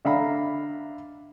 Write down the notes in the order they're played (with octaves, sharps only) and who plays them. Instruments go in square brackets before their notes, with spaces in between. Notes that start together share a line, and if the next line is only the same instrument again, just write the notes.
[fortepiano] D3 E5 F5 A#5 B5